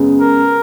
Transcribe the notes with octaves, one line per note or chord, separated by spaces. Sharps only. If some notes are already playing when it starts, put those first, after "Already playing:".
Already playing: F#2 C#3 G#3 B3
A#4